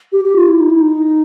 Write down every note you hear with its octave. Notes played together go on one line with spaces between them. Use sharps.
G4
G4
F4
E4
D#4
E4
D#4